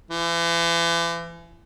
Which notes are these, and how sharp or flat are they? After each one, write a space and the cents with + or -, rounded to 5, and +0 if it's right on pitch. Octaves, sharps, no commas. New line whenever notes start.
E3 +40